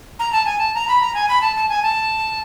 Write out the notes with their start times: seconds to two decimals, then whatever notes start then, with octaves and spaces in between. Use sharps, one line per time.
0.19 A#5
0.32 A5
0.46 G#5
0.58 A5
0.74 A#5
0.88 B5
1.01 A#5
1.14 G#5
1.29 B5
1.41 A5
1.56 A5
1.69 G#5
1.83 A5